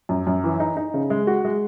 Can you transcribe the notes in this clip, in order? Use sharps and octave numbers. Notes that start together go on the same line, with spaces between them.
F#2
F#2
E3
D#4
D#4
C#3
G#3
F#4
G#3